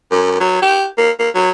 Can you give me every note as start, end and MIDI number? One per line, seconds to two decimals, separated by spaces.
0.11 0.37 42
0.40 0.58 54
0.62 0.85 67
0.97 1.10 58
1.19 1.29 58
1.34 1.50 54